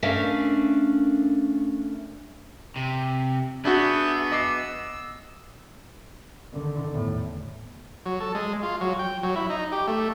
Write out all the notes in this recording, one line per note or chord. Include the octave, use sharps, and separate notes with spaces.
A3 C#4 D4 A#4 E5 F5
C3
B3 D4 F#4 G#4 E5 G6
D#5 D6 E6 C7
D3 D#3
E2 A2
F#3
A4
G#3
F4
F#3
G5
F#3
E4
D#4
G4
A3